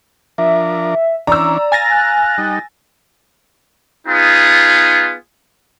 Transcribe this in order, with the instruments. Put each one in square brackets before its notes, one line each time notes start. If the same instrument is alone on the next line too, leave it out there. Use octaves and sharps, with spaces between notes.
[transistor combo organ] F3 D4 A#4 [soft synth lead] E5
[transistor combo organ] E3 C#4 D4 [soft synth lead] D5 [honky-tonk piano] A#5 E6
[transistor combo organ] F5 [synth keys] G#5 A6 A#6
[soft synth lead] F#6
[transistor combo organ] G3 D#4
[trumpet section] B3 D#4 F4 G#4